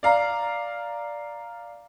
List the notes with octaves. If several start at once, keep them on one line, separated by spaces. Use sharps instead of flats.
D5 F5 A#5